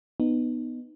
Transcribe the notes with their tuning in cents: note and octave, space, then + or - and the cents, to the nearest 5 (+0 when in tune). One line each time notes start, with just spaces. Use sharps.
B3 +0 D#4 -15